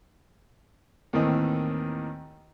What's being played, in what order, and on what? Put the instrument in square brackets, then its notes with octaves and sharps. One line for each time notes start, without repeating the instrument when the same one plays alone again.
[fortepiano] D#2 A2 D#3 E3 C4 D#4